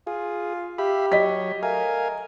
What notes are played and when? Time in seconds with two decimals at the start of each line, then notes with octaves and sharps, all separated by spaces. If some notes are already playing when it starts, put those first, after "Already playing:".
0.07 F4 G#4
0.78 G4 E5 F5 B5
1.12 F#3 C#5 D#5 B6
1.63 A3 A#4 F5 G#5